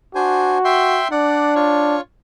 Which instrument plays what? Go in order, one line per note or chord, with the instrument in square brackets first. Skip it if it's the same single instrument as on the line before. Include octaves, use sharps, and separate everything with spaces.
[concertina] D4 C5 G#5 [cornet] F#4
[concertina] E5 G5 C6
[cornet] D4 [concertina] D5 F#5
[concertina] F4 C#5